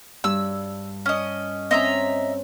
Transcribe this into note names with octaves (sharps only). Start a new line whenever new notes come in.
G2 E6
C#4 D#5
C4 C#4 D#5 E5 A#5